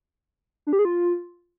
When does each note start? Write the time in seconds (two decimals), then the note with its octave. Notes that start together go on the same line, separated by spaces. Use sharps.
0.67 D4
0.73 G4
0.79 G#4
0.85 F4